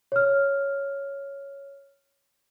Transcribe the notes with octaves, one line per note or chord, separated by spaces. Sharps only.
C#5 F6